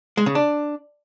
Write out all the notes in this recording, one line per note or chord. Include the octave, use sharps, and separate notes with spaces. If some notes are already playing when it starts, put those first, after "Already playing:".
G#3
C#3
D4